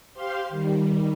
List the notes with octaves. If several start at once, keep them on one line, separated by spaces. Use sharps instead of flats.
G4 C5 F5 C6
D#3 G3